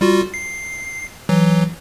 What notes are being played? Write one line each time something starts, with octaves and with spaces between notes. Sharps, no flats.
G3 F4 F#4
C7
E3 F#3